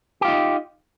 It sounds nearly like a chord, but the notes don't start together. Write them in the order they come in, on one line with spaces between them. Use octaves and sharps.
G4 F4 D#4